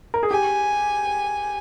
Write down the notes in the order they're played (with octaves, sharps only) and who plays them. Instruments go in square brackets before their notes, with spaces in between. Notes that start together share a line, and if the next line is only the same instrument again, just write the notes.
[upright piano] A#4
G#4
[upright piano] G4 [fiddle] G#5